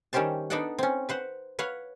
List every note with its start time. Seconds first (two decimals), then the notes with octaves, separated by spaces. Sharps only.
0.13 D#3 G3 C#4 G4 C5 A5
0.50 B3 D4 D#4 A4 D5 F#5
0.79 C4 C#4
1.09 B4 C5 F#5
1.59 B4 C#5 F5 F#5